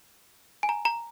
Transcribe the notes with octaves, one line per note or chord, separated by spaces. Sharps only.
G#5
A#5
A#5